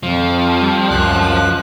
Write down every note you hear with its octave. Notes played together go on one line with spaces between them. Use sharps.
F2 F3
G3
C#2 F#2 F#6